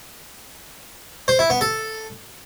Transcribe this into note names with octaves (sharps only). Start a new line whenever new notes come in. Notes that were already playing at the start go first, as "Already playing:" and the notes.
C5
E4
B3
A4